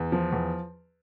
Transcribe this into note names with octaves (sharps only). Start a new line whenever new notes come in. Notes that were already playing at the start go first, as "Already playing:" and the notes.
Already playing: E2
F3
E2